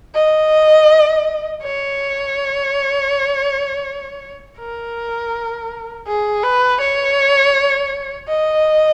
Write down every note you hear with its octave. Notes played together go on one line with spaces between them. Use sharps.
D#5
C#5
A#4
G#4
B4
C#5
D#5